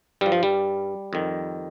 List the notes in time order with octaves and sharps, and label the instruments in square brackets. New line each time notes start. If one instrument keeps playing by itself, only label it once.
[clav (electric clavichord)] G2 F3 G3
F3
G3
F2 D#3